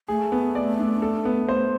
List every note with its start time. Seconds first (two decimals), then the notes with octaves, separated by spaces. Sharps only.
0.08 A3 G#4
0.32 B3
0.55 D5
0.79 D4
1.02 A4
1.25 B3
1.49 C5